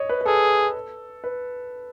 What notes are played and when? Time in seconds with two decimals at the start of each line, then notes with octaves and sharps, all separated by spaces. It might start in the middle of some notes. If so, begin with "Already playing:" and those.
Already playing: C#5 D#5
0.09 B4
0.21 B4
0.25 G#4 A4
1.24 B4